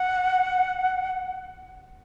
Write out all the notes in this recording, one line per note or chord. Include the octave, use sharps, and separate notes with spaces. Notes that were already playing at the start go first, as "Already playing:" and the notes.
Already playing: F#5